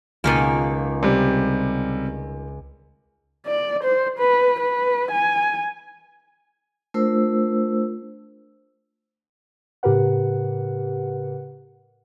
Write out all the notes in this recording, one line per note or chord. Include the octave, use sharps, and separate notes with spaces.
C#2 B2 D#3 A#3 D#7
C3 G3
D5
C5
B4
B4
G#5
A3 D4 F4 A#4 C5 E6
A2 C#3 G4 A#4 B4 F#5